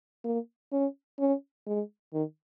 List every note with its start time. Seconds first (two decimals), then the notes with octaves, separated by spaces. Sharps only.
0.25 A#3
0.72 C#4
1.19 C#4
1.67 G#3
2.14 D#3